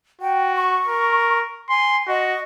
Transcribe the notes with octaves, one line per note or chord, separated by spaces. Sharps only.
F#4 G5
C#6
A#4
G#5 C6
F#4 D#5